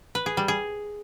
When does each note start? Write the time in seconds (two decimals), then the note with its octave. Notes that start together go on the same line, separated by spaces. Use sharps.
0.15 B4
0.26 G#4
0.37 G3
0.48 G#4